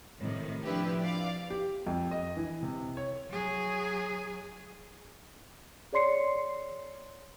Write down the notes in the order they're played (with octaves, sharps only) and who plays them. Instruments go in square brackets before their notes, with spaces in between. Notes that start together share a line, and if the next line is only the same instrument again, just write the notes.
[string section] A2 C3 D#3
F3 D4 E4 G4 B4
D5 F5 D6
[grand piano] G4
F2
D#5
E3
C3
C#5
[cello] F#3 G#4
[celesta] G#4 C#5 D5 C6 C7 C#7